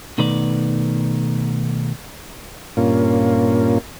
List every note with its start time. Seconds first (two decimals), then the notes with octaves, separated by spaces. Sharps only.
0.18 B2 D#3 A3 B4 D5
2.77 G2 A#2 A#3 C#4 F4